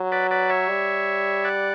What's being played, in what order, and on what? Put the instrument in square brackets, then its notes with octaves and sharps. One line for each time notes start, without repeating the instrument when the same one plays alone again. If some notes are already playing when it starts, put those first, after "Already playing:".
Already playing: [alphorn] F#3
[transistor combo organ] B4 D5
B4 D5
C#5 E5
[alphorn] G3
[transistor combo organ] D5 F#5